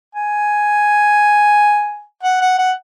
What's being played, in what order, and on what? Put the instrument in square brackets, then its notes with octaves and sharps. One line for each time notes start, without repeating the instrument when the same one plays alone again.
[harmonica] G#5
F#5
F#5
F#5